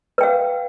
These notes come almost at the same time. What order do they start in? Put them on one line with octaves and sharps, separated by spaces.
B4 G5 F5